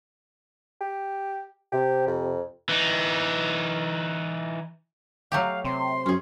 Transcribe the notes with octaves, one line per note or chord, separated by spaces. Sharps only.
G4
C3 G4
F2
E3 D#4
F#3 A3 G4 F5
C3 C6
F#2 C#4 G#4